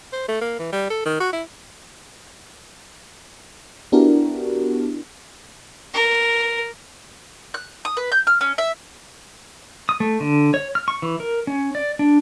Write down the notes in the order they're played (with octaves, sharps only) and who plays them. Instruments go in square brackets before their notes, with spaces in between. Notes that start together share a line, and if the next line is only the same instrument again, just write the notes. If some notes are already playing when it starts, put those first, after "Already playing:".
[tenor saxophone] C5
A3
A#3
E3
G3
A4
D#3
F#4
E4
[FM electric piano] B3 D4 E4 F#4 G4 A#4
[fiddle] A#4
[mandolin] F#6
D#6
B4
G6
F6
C#4
E5
[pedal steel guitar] D#6
A3
D3
C#5
F6
C#6
E3
A#4
C#4
D5
D4